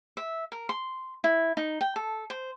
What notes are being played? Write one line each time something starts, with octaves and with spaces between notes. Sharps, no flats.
E5
A#4
C6
E4
D#4
G5
A4
C5